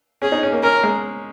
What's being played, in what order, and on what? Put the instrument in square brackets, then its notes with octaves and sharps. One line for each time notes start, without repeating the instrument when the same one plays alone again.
[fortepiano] C#4 [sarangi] G#4
[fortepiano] D#4
C#4
A#3
[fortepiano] C#4 [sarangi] A#4
[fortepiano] G#3